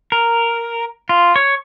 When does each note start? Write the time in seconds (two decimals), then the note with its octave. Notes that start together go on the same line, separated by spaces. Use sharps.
0.12 A#4
1.09 F4
1.36 C#5